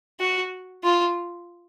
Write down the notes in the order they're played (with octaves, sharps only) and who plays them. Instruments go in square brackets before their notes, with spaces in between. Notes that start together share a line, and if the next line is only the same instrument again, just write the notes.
[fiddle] F#4
F4